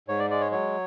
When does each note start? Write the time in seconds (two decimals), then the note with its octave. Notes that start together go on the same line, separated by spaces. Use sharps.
0.08 G#2 C#5
0.19 D5
0.30 G#3 D5
0.41 C#5
0.51 F#3 C#5